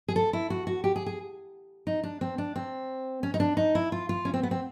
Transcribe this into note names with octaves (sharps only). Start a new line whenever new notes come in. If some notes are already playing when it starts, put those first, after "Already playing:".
G#4
A4
E4
F#4
F#4
G4
G#4
G#4
D#4
D4
C4
D4
C4
C#4
D#4
D4
D#4
E4
F4
F4
C#4
C4
B3
C4